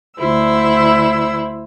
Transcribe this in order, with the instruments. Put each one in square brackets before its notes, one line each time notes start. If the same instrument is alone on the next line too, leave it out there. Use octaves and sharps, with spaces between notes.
[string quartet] D2 D3 E4 C5 E6